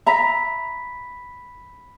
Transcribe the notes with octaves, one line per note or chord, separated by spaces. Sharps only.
E5 A#5 B5 B6